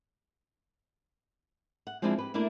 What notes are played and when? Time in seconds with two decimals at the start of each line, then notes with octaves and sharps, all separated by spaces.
1.87 F#5
2.02 F3 G#3 C4 D4 E4 F4
2.18 G4 B4
2.34 A3 A#3 D4 E4 A#4